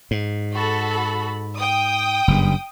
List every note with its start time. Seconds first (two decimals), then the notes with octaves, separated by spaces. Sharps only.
0.11 G#2
0.54 F#4 A4 B5
1.58 G5 D#6
2.28 F#1 G2